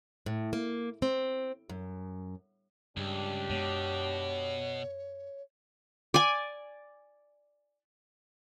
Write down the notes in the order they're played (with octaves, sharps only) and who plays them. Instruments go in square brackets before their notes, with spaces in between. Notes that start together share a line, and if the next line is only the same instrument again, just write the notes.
[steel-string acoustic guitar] A2
A#3
C4
F#2
[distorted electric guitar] C#2 [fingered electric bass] G2 [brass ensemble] D4 G4
[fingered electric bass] F#2 G#3 B3 [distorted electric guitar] B2 [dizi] C#5
[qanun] D5 G#5